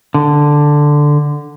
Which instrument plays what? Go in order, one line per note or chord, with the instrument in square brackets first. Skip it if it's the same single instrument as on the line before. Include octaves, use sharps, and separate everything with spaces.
[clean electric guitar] D3